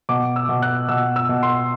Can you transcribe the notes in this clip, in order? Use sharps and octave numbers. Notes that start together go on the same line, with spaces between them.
B2 D6
E6
B2
F#6
B2 E6
E6
B2
C6